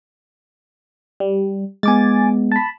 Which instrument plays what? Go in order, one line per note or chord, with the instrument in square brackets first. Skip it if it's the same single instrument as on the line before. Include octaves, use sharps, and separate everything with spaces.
[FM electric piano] G3
[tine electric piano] G#3 B3 [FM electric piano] G#5 D6 A6
[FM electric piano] A5 B5